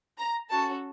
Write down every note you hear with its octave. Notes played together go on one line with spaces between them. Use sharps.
A#5
C#4 F#4 A4 A5